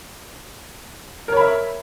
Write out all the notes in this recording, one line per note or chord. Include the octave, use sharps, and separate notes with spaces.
A#4 C#5 E5 B5